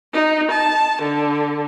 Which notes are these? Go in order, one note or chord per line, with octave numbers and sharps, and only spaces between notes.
D#4
A5
D3